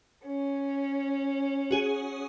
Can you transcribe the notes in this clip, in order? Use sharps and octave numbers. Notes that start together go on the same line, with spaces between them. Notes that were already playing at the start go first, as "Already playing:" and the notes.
C#4
F#4 G#4